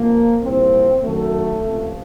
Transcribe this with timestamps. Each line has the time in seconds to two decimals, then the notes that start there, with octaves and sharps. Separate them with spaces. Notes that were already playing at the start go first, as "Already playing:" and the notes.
Already playing: C#2 C3 F3 A#3
0.42 C2 A#2 F3 C4
1.03 F#2 D#3 F#3 A3
1.63 C#2 C3 F3